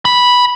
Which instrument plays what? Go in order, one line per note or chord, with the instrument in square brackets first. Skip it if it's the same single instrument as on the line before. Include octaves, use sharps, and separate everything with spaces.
[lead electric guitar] B5